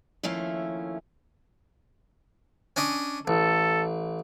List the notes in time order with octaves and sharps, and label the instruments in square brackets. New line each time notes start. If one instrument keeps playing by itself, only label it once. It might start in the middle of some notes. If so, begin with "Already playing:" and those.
[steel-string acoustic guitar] D#2 F3 A3 C#4 E4 F5
[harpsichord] C#4 D4 D#5
[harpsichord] A1 [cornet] A4